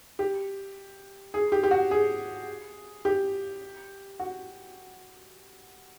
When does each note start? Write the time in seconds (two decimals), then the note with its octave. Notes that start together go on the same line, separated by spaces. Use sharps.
0.19 G4
1.34 G#4
1.52 G4
1.63 G4
1.71 F#4
1.91 G#4
3.05 G4
4.19 F#4